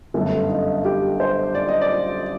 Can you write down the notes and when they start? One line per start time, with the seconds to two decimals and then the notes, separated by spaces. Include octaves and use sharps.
0.14 G1 F#2 D3 A3 A4
0.49 D#4
0.85 G4
1.20 C5
1.55 D5
1.69 D#5
1.81 D5